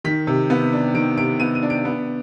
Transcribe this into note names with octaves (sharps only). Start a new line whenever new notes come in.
D#3 B6
C3
B3
D4
D#3 D7
C3 D7
B3 D#7
D#7
D4
D7
B3